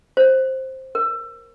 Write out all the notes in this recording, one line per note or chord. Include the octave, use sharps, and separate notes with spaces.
C5
A#4